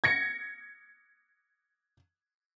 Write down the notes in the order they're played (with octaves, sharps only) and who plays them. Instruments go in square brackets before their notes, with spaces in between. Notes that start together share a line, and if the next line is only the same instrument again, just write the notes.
[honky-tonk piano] G#6 A#6 C#7